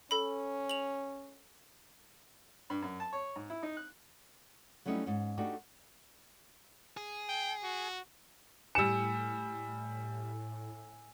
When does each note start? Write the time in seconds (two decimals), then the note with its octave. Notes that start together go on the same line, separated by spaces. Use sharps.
0.11 C#4 A4 B5
0.69 F7 F#7
2.70 G2
2.82 F#2
3.00 A5
3.13 C#5
3.36 G#2
3.50 E4
3.63 D#4
3.77 F#6
4.86 F#3 G3 A3 C#4 D#4 E4
5.06 G#2 C#4
5.37 A3 D4 D#4 F#4 G4
6.97 G#4
7.29 G5
7.63 F#4
8.75 A2 G3 G#5 E6 C#7 E7